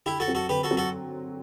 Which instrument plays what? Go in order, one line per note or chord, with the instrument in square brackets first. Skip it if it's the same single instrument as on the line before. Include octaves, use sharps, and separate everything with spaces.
[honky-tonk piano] D3 [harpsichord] E4 G4
[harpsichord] F#4 A4
[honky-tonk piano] F#3 C4
[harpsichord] F#4 A4
[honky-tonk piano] D3 [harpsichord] G4 B4
[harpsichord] F#4 A4
[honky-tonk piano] F#3 C4
[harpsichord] F#4 A4